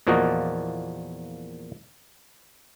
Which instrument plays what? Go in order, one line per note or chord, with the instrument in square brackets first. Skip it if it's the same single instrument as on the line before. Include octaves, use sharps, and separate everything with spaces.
[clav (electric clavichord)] E2 A#2 F3 A#3 F#4 D#5